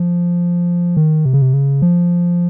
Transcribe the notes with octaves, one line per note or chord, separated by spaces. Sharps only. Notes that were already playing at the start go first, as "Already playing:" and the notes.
Already playing: F3
D#3
C3
C#3
C3
C#3
F3